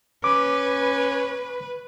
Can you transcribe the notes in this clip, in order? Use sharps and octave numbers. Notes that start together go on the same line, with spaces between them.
C#4 B4 D6